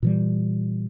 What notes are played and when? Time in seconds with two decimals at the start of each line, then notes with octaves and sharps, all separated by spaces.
0.03 A#2 E3 G3